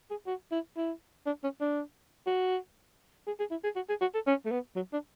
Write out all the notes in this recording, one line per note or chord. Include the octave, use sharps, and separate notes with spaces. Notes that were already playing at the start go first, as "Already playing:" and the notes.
G#4
F#4
E4
E4
D4
C#4
D4
F#4
G#4
G#4
E4
G#4
F#4
G#4
F#4
A4
C#4
A3
B3
F#3
D4